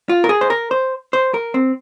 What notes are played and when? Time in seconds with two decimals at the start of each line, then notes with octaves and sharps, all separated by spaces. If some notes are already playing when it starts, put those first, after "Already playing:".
0.09 F4
0.24 A#4
0.29 G#4
0.41 C5
0.50 A#4
0.71 C5
1.13 C5
1.34 A#4
1.54 C4